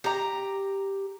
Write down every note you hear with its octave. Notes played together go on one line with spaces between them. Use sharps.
G4 A#5